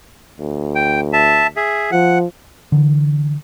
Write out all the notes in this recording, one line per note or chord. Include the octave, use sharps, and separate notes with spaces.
D2
G5
E5 A5
G#4 E5
F3 F#5
D3 E3